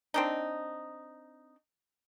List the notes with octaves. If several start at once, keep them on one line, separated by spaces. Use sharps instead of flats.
C4 D4 D#4